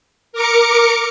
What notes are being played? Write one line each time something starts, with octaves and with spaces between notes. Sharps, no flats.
A#4 D6 C#7